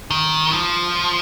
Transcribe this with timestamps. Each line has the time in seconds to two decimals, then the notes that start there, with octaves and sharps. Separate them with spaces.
0.10 D#3
0.52 F3